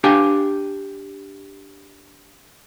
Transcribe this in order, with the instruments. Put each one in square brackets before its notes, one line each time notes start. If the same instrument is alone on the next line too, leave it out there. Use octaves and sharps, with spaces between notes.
[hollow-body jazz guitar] D4 G4 F5 G5 G#5